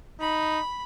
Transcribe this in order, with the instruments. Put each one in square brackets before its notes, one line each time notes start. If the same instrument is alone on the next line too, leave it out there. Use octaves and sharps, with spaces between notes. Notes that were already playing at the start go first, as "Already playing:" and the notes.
[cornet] D#4 [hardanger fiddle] B5